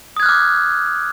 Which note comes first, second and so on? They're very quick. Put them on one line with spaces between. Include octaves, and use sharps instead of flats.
D#6 G#6 F#6 F6 D6